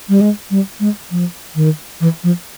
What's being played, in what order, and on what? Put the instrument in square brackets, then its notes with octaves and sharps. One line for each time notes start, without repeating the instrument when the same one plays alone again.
[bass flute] G3
G#3
G3
G#3
F3
D#3
E3
F3